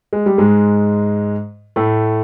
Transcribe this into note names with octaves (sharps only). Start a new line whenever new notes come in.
G#3
G3
G#2 G#3
A2 A3